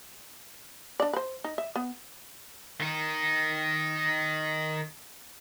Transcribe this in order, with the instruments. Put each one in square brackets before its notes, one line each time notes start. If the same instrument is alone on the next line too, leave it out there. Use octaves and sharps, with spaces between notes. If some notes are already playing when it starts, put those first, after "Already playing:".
[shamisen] D4 D5
B4 C5
D#4
E5
B3
[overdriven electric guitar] D#3 D#4